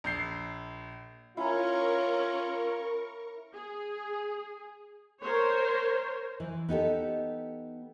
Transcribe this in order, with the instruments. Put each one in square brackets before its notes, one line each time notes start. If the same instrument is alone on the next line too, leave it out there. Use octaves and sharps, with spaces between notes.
[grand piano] A#1 G6 C7
[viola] C#4 [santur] E4 G#5 A#5 [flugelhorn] F4 [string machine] A#4 C#6
[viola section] G#4
A#4 C5 C#5
[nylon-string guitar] E3
B3 D#4 G4 A4